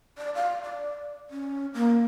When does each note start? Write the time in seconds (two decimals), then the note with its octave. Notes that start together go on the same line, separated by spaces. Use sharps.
0.18 D5
0.35 F5
0.63 D5
1.30 C#4
1.74 A#3